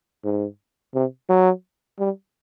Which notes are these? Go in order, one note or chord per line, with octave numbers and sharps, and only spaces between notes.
G#2
C3
F#3
G3